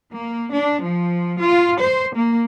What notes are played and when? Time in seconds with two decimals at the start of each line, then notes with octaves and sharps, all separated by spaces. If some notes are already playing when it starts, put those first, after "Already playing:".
0.12 A#3
0.53 D4
0.83 F3
1.41 F4
1.81 C5
2.16 A#3